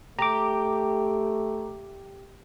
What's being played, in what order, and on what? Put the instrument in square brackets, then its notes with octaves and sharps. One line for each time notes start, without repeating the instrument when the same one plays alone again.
[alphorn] A3 [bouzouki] G4 [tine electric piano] A#5 D6